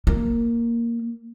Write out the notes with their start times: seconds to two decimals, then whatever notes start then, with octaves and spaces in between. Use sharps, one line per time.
0.07 A#3